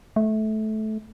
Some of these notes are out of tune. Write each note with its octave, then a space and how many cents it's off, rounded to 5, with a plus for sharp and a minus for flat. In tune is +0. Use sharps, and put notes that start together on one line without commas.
A3 -20